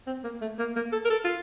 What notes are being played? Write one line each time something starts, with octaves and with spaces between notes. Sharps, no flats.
C4
A#3
A3
A#3
A#3
A4
A#4
A4
F4